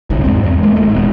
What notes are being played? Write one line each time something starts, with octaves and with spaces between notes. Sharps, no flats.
G1 C2 G2
E2 G#2 C4
E2
G#3 A#3
G#1 G#3 A3
D#1 B2